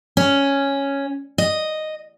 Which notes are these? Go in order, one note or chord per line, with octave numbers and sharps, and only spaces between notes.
C#4
D#5